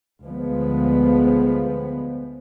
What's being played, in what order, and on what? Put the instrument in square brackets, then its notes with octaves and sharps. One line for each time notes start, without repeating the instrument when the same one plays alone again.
[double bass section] D2 F3 G#3 B3